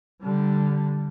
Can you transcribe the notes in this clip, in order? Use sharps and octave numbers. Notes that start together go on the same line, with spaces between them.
D3 G3